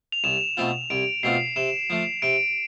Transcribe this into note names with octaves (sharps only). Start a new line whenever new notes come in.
F7
C2 E7
B2 A3 C4 F4
C2 D7
B2 A3 C4 F4 C7
C3 E7
F3 A3
C3 D7